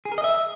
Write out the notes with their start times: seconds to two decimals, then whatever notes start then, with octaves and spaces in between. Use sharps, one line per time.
0.05 G#4
0.12 A#4
0.18 D#5
0.24 E5